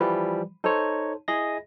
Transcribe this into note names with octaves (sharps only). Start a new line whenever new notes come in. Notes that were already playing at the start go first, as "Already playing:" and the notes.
E3 F3 G3 B4
D#4 A4 C5 C#5
E4 G#4 D#5 A#6